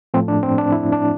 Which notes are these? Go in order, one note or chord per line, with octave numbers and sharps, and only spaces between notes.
A2 F3 A3 C4
D4
C4
D4
E4
D4